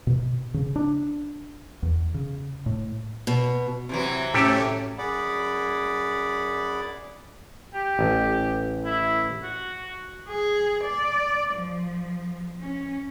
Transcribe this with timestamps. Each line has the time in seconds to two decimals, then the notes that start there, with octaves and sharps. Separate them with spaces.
0.07 B2
0.54 C#3
0.76 D4
1.83 E2
2.14 C#3
2.66 A2
3.27 B2
3.89 C3 E3 F#3
4.34 A2 A3 C#4 G4 A4
4.98 F#2 G#4 D5 F#5 B5 D6
7.74 G4
7.99 A1
8.86 E4
9.43 F#4
10.29 G#4
10.84 D5
11.55 F3
12.60 C#4